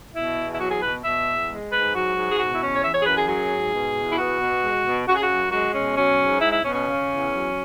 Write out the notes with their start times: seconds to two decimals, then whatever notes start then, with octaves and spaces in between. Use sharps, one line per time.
0.15 B2 E4
0.37 E2
0.53 E4
0.59 F#3 F#4
0.71 G#4
0.82 B2 B4
1.04 B2 E5
1.27 E2
1.49 G#3
1.71 G#2 B4
1.93 F#3 F#4
2.16 G#2
2.29 G#4
2.38 B2 F#4
2.52 E4
2.61 E2 C#4
2.75 C#5
2.83 E3 E5
2.94 C#5
3.01 G#4
3.05 F#2 B4
3.17 G#4
3.28 F#3 G#4
3.50 G#2
3.73 B2
3.95 E2
4.10 E4
4.18 B3 F#4
4.40 B2
4.63 G#3
4.85 B2
5.07 C#3 F#4
5.15 G#4
5.22 F#4
5.29 F#2
5.51 G#3 F#4
5.74 B2 C#4
5.96 F#3 C#4
6.19 G#2
6.41 G#3 E4
6.52 E4
6.63 B2 C#4
6.74 C#4
6.86 C#3
7.08 E2
7.31 F#3